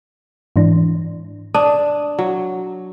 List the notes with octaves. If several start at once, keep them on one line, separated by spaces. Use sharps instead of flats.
G#2 E3 D4
D4 D#6
F#3